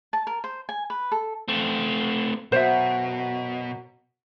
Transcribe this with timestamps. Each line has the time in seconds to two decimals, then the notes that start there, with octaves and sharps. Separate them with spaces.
0.13 A5
0.27 A#4
0.44 C5
0.69 G#5
0.90 B4
1.12 A4
1.48 A3 C4
2.52 F#2 B2 F#3 C5 E5